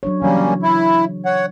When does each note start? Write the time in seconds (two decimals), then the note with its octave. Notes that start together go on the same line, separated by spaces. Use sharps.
0.03 F#3 D4 C#5
0.22 C#3 E3 F#3 G3 A#3 C#4
0.63 E4
1.25 C#5 F#5